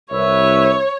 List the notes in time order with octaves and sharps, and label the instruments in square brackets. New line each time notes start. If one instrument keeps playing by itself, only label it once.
[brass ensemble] C2 B4 E5 [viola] C#5